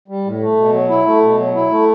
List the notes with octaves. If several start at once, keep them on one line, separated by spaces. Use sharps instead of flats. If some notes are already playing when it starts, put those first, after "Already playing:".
G3
A2
A3
B2
F#3
E4
A3
B2
F#3
E4
A3